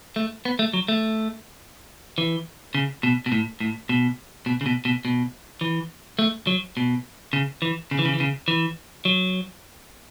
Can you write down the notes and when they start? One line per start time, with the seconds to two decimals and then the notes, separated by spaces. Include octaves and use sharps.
0.16 A3
0.45 B3
0.59 A3
0.73 F#3
0.88 A3
2.18 E3
2.75 C#3
3.03 B2
3.26 B2
3.32 A2
3.60 A2
3.89 B2
4.46 B2
4.61 C#3
4.66 B2
4.85 B2
5.05 B2
5.61 E3
6.19 A3
6.47 F#3
6.77 B2
7.33 C#3
7.62 E3
7.91 C#3
7.99 E3
8.05 C#3
8.13 E3
8.20 C#3
8.48 E3
9.05 F#3